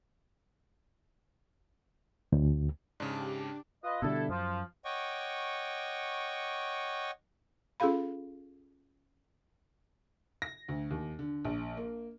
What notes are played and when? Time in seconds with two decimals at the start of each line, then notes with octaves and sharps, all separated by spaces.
2.32 D2
3.00 G#2 C#3 D4 G4 D6
3.84 F4 B4 D#5
4.02 B2 D3 G3 E4 A4
4.29 F#2 F3
4.85 C#5 D#5 F#5 G5 C#6 D6
7.80 C#4 F4 G#4 A4 F5 B5
10.42 A#6
10.68 D2
10.91 D#2
11.19 D3
11.45 A#1
11.77 A#3